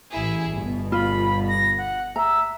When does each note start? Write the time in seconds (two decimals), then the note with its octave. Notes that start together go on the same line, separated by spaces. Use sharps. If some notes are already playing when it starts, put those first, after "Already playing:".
0.10 A1 E4 G#4
0.51 G1 B2
0.92 F4 B5
1.48 A#6
1.78 F#5
2.16 E5 A#5